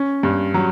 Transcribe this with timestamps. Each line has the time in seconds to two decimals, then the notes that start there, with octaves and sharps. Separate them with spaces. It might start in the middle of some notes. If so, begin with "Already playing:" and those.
Already playing: C#4
0.23 G2
0.54 F#3